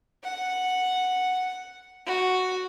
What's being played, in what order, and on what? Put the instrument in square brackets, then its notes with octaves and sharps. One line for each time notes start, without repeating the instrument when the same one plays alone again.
[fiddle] F#5
F#4